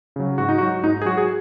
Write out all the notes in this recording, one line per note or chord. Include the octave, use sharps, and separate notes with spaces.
C#3 F#3
G#2 F#4
D#4
F#4
F#3
G#2 D#4
G#4
F#3 F#4
G#4